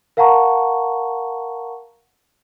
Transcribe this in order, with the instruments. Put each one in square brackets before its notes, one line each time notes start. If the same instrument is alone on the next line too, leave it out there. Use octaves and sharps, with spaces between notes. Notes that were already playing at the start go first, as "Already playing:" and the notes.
[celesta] A#4 F5 F#5 A5 A#5 C#6